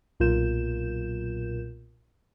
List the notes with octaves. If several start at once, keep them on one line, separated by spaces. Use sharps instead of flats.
B1 A#2 F4 A#4 G6 E7